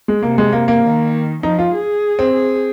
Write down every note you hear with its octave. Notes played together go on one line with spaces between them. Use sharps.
G#3
C3 A#3
G#3
A#3
A#3
D#3
F3 D#4
F4
G#4
C4
G#4